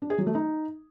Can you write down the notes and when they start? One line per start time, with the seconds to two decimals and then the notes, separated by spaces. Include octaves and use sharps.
0.02 D4
0.10 G#4
0.18 F#3
0.27 A3
0.35 D#4